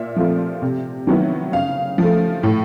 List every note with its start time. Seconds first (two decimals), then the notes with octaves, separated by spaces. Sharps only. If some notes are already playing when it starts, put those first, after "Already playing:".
Already playing: A#2 E5
0.16 F3 A3 C4 F4
0.62 C3
1.07 D#3 F#3 B3 E4
1.53 C#3 F5
1.98 F3 A3
2.43 A2